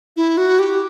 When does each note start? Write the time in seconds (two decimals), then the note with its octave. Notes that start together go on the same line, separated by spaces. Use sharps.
0.17 E4
0.37 F#4
0.59 G4